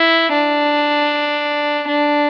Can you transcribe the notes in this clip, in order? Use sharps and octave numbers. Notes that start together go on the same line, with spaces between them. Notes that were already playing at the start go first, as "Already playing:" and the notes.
Already playing: E4
D4
D4